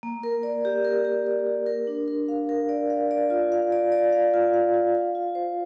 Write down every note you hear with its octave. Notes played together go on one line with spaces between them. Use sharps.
A#3
A#4
D5
G4
A#4
G4
D5
G4
A#4
D4
A#4
F5
A#4
D5
F5
D5
F4
F5
D5
D5
F5
F4
F5
F4
F5
F4
C5